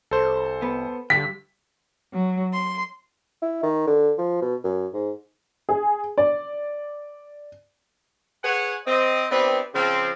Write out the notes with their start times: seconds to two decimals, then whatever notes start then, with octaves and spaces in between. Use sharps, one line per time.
0.11 C2 A4 C5
0.62 B3
1.10 G2 D3 G4 G5 B6
2.14 F#3
2.52 C6
3.42 E4
3.63 D#3
3.87 D3
4.18 F3
4.42 B2
4.64 F#2
4.94 G#2
5.69 G#4
6.18 D5
8.44 G#4 B4 C#5 F#5
8.87 C4 D#5
9.31 B3 C4 D4 E4 G4 B4
9.74 C#3 F3 C4